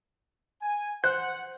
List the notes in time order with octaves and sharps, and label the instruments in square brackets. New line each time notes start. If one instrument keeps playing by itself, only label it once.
[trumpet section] G#5
[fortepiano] C5 [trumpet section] F#5 [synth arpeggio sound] F#6